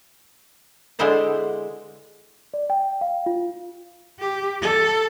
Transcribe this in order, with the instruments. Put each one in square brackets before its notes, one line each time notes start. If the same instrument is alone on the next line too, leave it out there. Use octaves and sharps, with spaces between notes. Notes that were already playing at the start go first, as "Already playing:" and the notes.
[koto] D3 G#3 B3 E4 C5 D5
[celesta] D5
G5
F5
F4
[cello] G4
A4